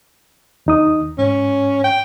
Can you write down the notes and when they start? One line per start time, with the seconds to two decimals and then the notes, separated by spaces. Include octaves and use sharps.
0.66 D#2 D#4 D#6
1.18 G#2 C#4
1.84 G5